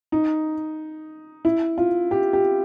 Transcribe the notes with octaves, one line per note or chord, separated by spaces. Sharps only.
D#4
E4
F4
G4
G4